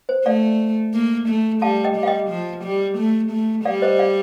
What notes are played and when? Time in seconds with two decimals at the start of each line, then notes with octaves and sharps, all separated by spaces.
0.09 C5
0.25 A3 D5 F5
0.94 A#3
1.28 A3
1.62 G3 F5 A5
1.84 D#5 G5
1.96 G3
2.03 F5
2.06 D#5 G5
2.30 F3
2.64 G3
2.97 A3
3.31 A3
3.65 G3 D5 F5
3.82 C5 D#5
3.99 D5 F5